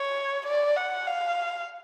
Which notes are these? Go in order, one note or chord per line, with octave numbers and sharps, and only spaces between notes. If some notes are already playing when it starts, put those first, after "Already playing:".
Already playing: C#5
D5
F#5
F5